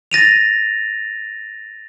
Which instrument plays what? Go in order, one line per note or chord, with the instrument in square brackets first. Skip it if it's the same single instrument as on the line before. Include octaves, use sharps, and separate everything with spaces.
[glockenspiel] A6 A#6 D#7 F7